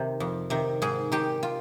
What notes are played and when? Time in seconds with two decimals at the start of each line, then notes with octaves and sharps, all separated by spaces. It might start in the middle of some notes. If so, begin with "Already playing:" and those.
Already playing: C3 D#3
0.20 F2
0.50 C3 D#3
0.82 G#2 G#4
1.12 D#3 G4
1.43 F4